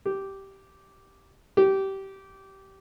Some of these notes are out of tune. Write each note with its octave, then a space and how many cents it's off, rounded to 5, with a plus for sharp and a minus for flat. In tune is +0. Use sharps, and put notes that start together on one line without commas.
G4 -10
G4 -20